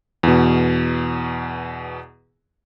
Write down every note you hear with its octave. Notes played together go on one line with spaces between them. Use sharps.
E2 B2